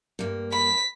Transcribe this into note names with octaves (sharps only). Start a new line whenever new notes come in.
G2 A#3
B5 B6